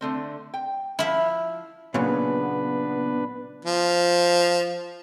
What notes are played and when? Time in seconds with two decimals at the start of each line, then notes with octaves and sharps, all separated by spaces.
0.01 D3 A3 C4
0.54 G5
0.99 F3 E4 E5 F5
1.94 A#2 C#3 F#3 B3 D4 B4
3.65 F3